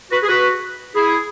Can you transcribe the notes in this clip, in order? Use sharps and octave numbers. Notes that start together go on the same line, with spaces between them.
F#4 B4
G#4
F#4 B4
E4 G#4